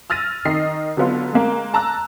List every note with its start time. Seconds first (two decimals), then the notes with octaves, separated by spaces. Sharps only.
0.10 E6 F6 A6 A#6 D#7
0.45 D#3 D#5 C7
0.97 D3 F#3 B3 F4
1.33 G#3 A#3
1.74 A5 A#5 E6 F#6